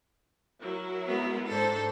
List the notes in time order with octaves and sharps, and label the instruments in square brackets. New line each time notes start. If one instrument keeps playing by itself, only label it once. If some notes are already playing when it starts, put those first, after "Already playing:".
[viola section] F#3 E4 A#4
[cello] G#3 B3
[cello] G#2 A4 [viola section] D4 C5